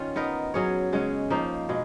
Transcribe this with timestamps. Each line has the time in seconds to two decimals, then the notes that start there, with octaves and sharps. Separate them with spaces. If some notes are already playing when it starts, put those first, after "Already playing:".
Already playing: D#3 C#4 F4
0.16 B3 D#4 A#4
0.54 F#3 C#4 G#4 C#5
0.92 C#3 G#3 C#4
1.30 F3 A#3 D#4
1.69 B2 G#3